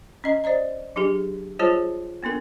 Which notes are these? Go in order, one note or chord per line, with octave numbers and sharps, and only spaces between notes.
C#4 D#5 A#5
C5 D5 D#5 A#5
F#3 D4 G4 G#4
G3 F4 G#4 C5 C#5 A5
A#3 B3 D4 A4 A#4